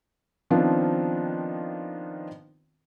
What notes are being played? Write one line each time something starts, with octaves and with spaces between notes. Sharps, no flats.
D#3 F3 B3 C4 D4 F4